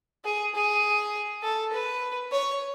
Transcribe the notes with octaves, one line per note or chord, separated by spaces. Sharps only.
G#4
G#4
A4
B4
C#5